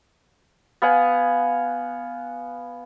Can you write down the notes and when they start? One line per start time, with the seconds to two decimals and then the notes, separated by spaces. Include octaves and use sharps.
0.82 B3 F5 F#5 G#5